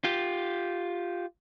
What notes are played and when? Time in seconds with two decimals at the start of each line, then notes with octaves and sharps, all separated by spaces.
0.04 F4 G4